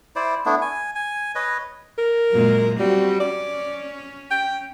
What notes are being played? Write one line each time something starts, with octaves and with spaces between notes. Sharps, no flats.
E4 C5 D5
A3 B3 D4 E4
G#5
G#5
B4 C#5 D#5
A#4
F#2 A#2 G#3
G3 C4 F#4
C#4 D5
G5